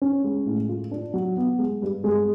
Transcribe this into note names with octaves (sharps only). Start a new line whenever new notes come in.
C#4
G#3
A2
F4
D4
F#3
B3
G#3
G2
G#3